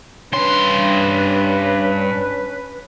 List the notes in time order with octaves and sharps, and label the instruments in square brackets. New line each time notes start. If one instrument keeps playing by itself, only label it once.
[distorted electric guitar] G2 C6 [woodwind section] C#4 D4 B4